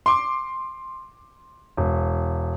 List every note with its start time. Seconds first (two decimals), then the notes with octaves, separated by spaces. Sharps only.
0.06 C6 D6
1.77 E1